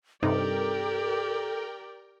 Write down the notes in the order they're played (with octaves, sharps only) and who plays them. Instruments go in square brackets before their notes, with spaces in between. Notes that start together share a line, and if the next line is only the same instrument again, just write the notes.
[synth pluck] G2 C3 D#4 [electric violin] G4 D5 [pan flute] A4 [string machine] A#4 G5